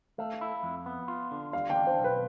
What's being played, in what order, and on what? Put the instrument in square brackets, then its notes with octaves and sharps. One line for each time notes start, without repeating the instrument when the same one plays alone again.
[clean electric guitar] A3 [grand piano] F5
[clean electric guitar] E4
F2
B3
F4
D3
[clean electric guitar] G3 [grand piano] F5
[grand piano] G5
[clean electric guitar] D4
[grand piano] C5
[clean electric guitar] B1
[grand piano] B4